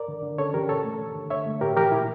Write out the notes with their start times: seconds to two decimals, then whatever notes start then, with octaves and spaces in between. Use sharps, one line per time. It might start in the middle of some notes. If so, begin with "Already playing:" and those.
Already playing: A#4 D5
0.08 D3
0.23 D3
0.38 C#4 A4 C#5
0.53 E3 G4 A#4
0.69 A#2 A4 C#5
0.84 A3
0.99 D3
1.15 D3
1.30 D3 C#5 E5
1.46 A3
1.61 A2 G4 A#4
1.77 E3 G4 A#4
1.92 A#2 E4